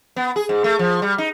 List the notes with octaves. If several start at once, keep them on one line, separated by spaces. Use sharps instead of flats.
B3
G#4
G#2
A3
F3
G3
D#4